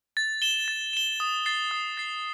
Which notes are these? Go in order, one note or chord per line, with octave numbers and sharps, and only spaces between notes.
A6
E7 G7
A6
E7 G7
D#6
A6 C7
D#6
A6 C7